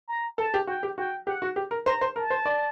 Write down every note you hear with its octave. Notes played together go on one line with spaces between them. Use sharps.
A#5
A4 A5
G4
F#4 G5
G4
F#4 G5
G4 F#5
F#4
G4
A#4
C5 A#5
C5
A#4 A5
C5
D5